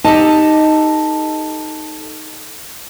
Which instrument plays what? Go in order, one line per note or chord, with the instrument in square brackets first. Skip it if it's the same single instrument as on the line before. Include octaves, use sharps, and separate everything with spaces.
[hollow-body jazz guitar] D#4 [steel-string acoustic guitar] G4 A4 A5